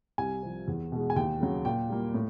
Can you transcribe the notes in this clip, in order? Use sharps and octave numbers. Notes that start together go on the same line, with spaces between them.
C2 G#5
C3 F3
E2
B2 G#3
G#5
D#2 G5
C#3 F#3
A#2 G5
G3 A#3
A2